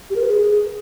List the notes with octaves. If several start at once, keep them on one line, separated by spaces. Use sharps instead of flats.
G4
A#4
B4
G#4